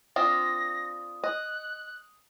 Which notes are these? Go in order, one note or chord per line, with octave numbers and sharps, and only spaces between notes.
C4 D4 F4 D#6 A#6
D#5 F#6